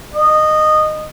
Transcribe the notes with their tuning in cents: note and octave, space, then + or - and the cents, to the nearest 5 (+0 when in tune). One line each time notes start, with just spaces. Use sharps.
D#5 -15